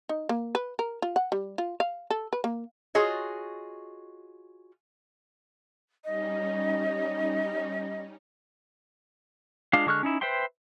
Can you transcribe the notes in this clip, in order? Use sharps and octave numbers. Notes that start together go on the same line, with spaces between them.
D#4
A#3
B4
A#4
F4
F#5
G3
F4
F5
A4
B4
A#3
F4 F#4 G#4 C#5 D#5
G3 C#4 D#4 D#5
G#3 D4 F4 F5
D3 G#3 C#6 F6 F#6
C#4 D#4 E4
B4 C5 E5 G5 C6